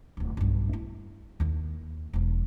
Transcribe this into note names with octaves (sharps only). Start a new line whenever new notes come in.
D1 G1
B1 G2
E4
D#2 E4
E1 F3